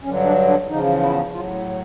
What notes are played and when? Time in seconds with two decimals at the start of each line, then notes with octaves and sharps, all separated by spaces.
0.03 G2 D3 F#3 C#4
0.25 D4
0.48 D4
0.69 E2 C#3 F3 D#4
1.02 E4
1.34 A2 F#3 F4